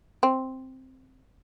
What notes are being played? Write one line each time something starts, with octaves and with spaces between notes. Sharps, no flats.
C4